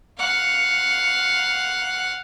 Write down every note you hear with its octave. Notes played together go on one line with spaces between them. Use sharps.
F5 F#5